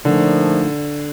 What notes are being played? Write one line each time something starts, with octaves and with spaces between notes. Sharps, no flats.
A#2 D3 F3 A3 D#4